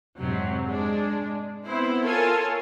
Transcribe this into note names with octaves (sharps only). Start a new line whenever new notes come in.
F2 G#2 C3 F#3 C4
G#3 D4
B3 C4 E4 C5
F4 A4 A#4 C#5 G#5 A5